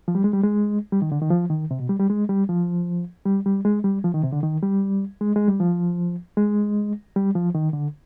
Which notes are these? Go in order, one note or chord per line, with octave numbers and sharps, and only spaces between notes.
F3
G3
G#3
G3
G#3
G3
D#3
D3
D#3
F3
D#3
C3
B2
G3
G3
G#3
G3
F3
G3
G3
G#3
G3
F3
D#3
C3
D3
D#3
G3
G#3
G#3
G3
F3
G#3
G3
F3
D#3
D3